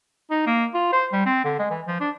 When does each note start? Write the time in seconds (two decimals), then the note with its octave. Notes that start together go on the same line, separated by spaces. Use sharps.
0.31 D#4
0.46 A#3
0.74 F4
0.93 C5
1.12 G3
1.26 C4
1.44 D3
1.59 G#3
1.71 E3
1.87 F3
2.00 D4